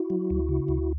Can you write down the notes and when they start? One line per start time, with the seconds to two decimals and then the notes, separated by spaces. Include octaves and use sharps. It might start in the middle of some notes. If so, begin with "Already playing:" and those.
Already playing: E4 F#4
0.10 F#3
0.30 D2
0.49 C#3
0.68 D2